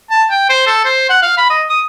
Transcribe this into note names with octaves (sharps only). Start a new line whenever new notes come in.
A5
G5
C5
A4
C5
F#5
F5
B5
D#5
D#6